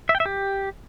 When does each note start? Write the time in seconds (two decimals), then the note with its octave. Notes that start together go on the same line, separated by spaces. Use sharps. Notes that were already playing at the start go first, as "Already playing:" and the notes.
0.09 E5
0.15 G5
0.20 E5
0.26 G4